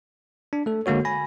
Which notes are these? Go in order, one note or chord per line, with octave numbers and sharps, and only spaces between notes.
D4
A3 A4
D3 G#3 A#3 F#4 C#5
G#5 B5 A#6